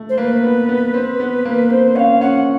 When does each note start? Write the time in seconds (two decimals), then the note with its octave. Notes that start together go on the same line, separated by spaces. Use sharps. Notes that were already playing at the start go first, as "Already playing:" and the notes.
Already playing: A3
0.09 C5
0.17 A#3 B4
0.43 B3
0.69 B3
0.94 C4
1.20 B3
1.45 A#3
1.70 C4 C5
1.96 C#4 F5 F#5
2.21 C#4 F#5